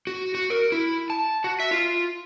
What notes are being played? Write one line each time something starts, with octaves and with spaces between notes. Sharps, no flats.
F#4
F#4
A#4
E4
A5
F#4
E5
F4